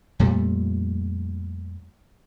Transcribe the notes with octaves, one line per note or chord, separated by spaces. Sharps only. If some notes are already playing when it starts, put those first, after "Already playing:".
F2 A#2 G3 A3